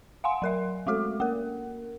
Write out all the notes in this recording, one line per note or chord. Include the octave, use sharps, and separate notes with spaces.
F5 F#5 G#5 C6
F#3 A#4 E5
G#3 A3 F#4 A4
A#3 A#4